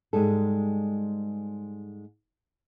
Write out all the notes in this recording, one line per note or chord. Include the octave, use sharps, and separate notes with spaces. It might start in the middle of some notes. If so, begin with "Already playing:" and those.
G#2 G3 G#3 A4